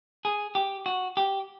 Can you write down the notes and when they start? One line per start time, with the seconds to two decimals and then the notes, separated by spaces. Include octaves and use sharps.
0.25 G#4
0.55 G4
0.86 F#4
1.17 G4